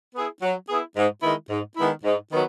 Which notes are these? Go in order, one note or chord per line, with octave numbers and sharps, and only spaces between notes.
B3 E4 G#4
F#3
B3 E4 G#4
G#2
D#3 G#3 B3 E4
G#2
D#3 G#3 B3 E4
G#2
D#3 F#3 B3